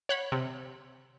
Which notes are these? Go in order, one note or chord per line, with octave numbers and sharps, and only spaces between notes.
C#5 F#5 B5
C3